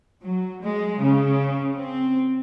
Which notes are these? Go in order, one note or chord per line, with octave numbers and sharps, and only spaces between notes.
F#3
G#3
C#3
C4